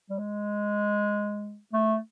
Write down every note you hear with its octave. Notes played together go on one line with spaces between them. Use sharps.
G3
G#3
A3